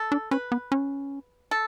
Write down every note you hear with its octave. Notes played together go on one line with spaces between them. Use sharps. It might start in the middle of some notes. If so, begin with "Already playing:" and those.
Already playing: A4
D4
C#4 B4
B3
C#4
A4